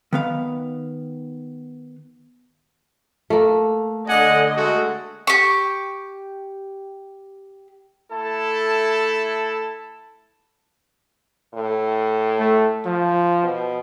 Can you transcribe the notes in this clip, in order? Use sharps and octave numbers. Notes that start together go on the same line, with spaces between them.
D#3 B3 F5
A3 A#3
D3 D5 D#5 F#5 G#5
G#3 A3 F#4
G4 C#6
A3 E4 A4 A5
A2
A3
F3
B2